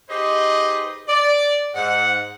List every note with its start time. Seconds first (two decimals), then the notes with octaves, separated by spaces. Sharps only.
0.10 D#4 G4 G#4 B4 C5 D#5
1.08 D5
1.75 G#2 F#5